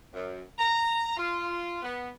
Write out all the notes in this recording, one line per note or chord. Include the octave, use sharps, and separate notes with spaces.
F#2
A#5
F4
B3